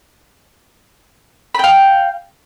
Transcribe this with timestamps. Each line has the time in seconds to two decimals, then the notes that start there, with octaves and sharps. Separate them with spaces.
1.55 B5
1.59 G5
1.64 F5